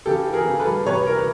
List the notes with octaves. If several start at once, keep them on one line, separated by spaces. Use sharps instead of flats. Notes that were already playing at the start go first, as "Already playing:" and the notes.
C#3 G4 A4
E3
G#4 A#4
C#3
A4 B4
G3
C3 B4 C#5
E3 A#4
B4